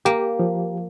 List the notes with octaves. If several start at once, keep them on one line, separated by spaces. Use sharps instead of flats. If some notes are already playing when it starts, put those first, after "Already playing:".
A#3 G4
F3